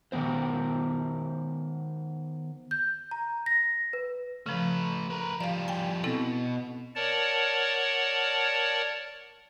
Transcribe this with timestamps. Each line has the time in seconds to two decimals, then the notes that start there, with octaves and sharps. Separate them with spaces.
0.12 D#3 E3 B3 C5
2.71 G6
3.11 A#5
3.46 A#6
3.93 B4
4.46 C#3 F3 A3 B4
5.10 A#4 B4
5.40 F3 G3 D5 F5
5.68 G5 G#5
6.04 B2 C4 E4 A4
6.95 A#4 C#5 D5 F#5 A5